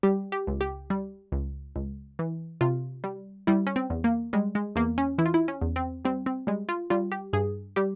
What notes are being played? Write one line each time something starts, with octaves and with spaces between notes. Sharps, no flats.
G3 G4
G4
C#2
G4
G3
C#2
C#2
E3
C3 F4
G3
G3 E4
C#4
C4
E2
A#3
G3 G#3
G#3
E2 A#3
C#4
E3 E4
F4
E4
C#4
E2
C4
G3 C4
C4
G3 G#3
F4
G3 F4
G4
G2 G#4
G3 G4